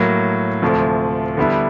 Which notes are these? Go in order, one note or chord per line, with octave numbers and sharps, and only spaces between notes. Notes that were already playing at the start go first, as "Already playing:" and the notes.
Already playing: A2 F#3 A#3
D2 C3 F3 A3
D3 G3 B3 E4